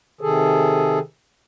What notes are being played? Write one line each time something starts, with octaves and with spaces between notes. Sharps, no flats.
C3 D#3 G#4 A4